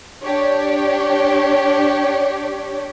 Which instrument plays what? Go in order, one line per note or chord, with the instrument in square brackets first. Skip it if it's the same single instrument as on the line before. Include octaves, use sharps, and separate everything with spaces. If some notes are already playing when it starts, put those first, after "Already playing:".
[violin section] D4 G4 C#5